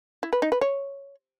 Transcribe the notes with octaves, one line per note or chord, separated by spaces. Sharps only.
E4
B4
D#4
B4
C#5